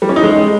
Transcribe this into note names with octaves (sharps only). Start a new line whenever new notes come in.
G3
C#4
D#4
G#3